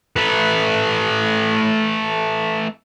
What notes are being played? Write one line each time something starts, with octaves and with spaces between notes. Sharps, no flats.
A3 B4